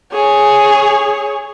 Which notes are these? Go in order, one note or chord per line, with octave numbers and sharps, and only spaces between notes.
G#4 C#5